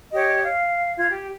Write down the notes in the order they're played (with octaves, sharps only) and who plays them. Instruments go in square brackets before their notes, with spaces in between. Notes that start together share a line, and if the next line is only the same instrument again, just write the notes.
[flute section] G4 C#5 D#5
F5
F4 G#6
G4